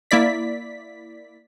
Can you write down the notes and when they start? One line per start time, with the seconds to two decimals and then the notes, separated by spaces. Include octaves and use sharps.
0.11 A#3 E4 D5 B6